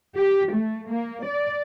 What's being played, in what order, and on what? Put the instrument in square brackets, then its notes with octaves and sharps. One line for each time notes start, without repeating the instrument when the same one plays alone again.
[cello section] G4
A3
A#3
D5